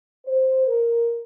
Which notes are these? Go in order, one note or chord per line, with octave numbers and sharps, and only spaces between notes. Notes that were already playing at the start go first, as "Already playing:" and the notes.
C5
A#4